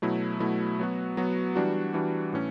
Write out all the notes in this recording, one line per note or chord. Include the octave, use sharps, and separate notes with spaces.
B2 F#3 A3 E4
B2 F#3 A3 E4
F#3 B3 F#4
F#3 B3 F#4
E3 G3 D4 F#4
E3 G3 D4 F#4
A2 E3 A3 C#4